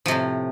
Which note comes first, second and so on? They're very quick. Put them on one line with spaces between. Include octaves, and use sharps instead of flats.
F3 C3 A2